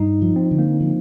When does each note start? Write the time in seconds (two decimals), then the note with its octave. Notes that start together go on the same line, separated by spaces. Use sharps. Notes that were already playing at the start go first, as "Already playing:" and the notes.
Already playing: G2 D#4
0.22 F3
0.36 C4
0.51 D3
0.58 A#3
0.81 F3